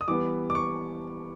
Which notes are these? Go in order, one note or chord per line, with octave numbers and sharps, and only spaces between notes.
D#6
E3 G3 B3 D6
D6
C#6